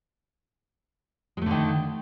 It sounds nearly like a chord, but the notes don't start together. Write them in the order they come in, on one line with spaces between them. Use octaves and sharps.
G#3 A3 D3 D#3